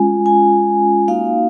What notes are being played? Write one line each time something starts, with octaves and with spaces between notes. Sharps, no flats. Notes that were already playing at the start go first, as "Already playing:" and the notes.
Already playing: G#3 C#4 F4 G#5
G#5
A#3 D#4 F#4 F5